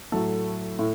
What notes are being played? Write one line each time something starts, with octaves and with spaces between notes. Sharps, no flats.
A2 F#3 A3 A4
A2